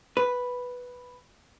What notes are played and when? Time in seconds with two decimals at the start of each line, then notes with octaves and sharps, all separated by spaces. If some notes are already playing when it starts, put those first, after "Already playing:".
0.17 B4